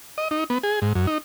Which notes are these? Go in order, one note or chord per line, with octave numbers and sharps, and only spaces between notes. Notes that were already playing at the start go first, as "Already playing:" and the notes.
D#5
D#4
B3
G#4
G#2
F#2
D#4